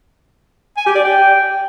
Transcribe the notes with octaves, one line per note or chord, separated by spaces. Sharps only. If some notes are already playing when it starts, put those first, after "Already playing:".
G#5
G4
D5
G5